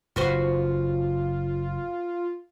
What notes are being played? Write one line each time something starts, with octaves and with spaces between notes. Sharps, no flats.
F#1 F4 F#4 B4 C5